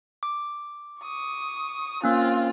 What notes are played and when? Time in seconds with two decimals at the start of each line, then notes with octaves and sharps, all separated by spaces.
0.23 D6
1.02 C#6 D#6
2.04 A#3 C4 C#4 F4